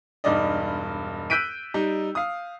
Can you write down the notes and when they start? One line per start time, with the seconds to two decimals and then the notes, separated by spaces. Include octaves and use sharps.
0.24 E1 G2 D#4 D5 D#5
1.30 E6 F#6 G6 B6 D7 D#7
1.74 G3 D#4
2.15 F5 D#6